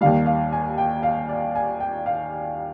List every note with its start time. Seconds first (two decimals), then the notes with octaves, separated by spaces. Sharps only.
0.01 D#2 D#3 G3 F5
0.26 F5
0.53 G#5
0.78 G5
1.03 F5
1.29 D5
1.55 G#5
1.80 G5
2.06 F5